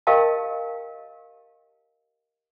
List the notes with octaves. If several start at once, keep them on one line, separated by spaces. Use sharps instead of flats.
G4 A#4 D#5 F5 G5 A5